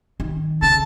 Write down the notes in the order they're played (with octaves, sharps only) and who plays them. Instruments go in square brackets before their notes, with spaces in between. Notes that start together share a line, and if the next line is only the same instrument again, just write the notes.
[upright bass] D#3
[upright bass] C#3 [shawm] A5